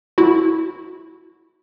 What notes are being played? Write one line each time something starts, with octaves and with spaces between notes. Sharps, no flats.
E4 F#4